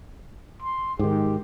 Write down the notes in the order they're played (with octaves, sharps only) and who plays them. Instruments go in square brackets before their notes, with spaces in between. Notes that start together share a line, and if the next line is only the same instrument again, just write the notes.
[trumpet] C6
[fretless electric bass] G#2 D#3 [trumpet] G4